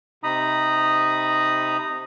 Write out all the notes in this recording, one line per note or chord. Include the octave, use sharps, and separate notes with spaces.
C3 D#4 A#5 B5 D#6